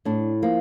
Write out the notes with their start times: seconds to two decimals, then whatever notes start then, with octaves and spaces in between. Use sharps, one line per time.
0.05 A2 D4
0.43 F3 A#3